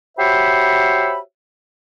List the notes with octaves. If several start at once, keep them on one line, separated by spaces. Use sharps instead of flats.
F#4 G4 C5 C#5 E5 B5